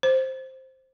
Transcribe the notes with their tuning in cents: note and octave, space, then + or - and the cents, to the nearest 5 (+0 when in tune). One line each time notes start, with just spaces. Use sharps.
C5 +5